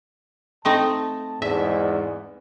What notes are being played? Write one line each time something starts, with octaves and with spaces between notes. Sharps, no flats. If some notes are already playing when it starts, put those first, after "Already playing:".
A3 C4 D#4 A5
E2 G#2 D5 E5